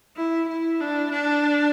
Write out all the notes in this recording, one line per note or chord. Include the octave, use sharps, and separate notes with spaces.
E4
E4
D4
D4